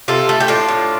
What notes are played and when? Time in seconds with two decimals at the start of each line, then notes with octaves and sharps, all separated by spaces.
0.08 C3 F4 A4
0.29 A3
0.40 G4
0.48 A2 D4 F4
0.68 A2